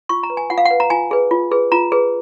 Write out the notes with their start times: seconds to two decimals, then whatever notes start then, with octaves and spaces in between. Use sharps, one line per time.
0.09 F4 C#6
0.23 A#5
0.30 B4
0.37 G#5
0.50 F4 F#5
0.58 F5
0.65 F#5
0.71 B4
0.80 A#5
0.90 F4 G#5
1.11 G#4 B4
1.31 F4
1.52 G#4 B4
1.72 F4 A#5
1.92 G#4 B4